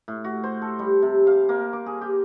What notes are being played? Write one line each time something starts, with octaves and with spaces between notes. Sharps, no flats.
A2
F#4
C5
A4
G3
C3
F5
A#3
D6
G#4
G4